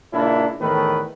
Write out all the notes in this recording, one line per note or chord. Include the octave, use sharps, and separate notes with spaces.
C#2 A#2 D4 E4
E2 A2 D#3 A3 B4